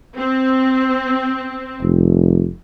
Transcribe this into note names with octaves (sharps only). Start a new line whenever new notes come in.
C4
F1